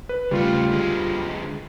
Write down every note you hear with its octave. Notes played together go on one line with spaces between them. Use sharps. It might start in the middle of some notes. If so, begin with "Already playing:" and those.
B4
C#3 G3 A3 F4
D3 G#3